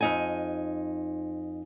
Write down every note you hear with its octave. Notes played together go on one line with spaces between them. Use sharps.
F2 D#4 G#5